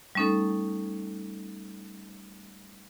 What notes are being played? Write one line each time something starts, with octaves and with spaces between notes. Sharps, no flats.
G3 A3 C#4 D#4 A4